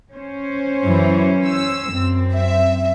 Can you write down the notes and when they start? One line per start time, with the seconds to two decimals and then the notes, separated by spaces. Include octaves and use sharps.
0.12 C#4 C5
0.84 F#2 E3
1.47 E6
1.91 F#2 C4
2.34 E5